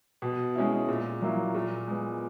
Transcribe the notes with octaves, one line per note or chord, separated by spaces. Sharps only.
B2
G#3 C#4 E4
A#2
F#3 A#3 E4
A#2
G#3 B3